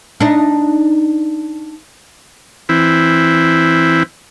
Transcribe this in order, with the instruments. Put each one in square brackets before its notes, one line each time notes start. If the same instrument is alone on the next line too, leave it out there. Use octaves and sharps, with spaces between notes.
[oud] D4 D#4
[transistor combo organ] E3 C4 E4